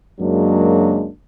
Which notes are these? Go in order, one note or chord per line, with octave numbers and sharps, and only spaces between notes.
F#2 C#3 F#3 G#3 A#3 D4